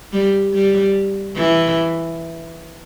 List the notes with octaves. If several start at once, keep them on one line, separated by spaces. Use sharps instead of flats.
G3
G3
E3